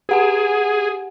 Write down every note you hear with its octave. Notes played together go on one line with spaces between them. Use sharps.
G4 G#4 F#5 G#5